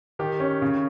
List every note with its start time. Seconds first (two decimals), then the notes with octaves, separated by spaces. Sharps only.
0.19 D#3 G4
0.40 C#4
0.62 C#3